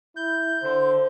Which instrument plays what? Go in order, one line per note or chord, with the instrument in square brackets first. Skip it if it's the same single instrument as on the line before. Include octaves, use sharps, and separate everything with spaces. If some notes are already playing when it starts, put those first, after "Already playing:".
[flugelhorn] E4 [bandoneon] G6
[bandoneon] D3 [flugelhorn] C5